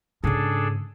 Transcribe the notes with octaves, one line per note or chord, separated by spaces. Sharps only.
G#2 C#3 D4 G#4 A4